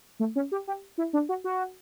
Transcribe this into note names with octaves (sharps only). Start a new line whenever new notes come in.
A3
C#4
G4
G4
E4
D4
F#4
F#4